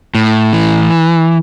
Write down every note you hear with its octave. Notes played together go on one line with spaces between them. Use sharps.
A2
E3